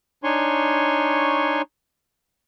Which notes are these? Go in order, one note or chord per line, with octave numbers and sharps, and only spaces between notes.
D4 D#4 C#5 G#5 C6 C#6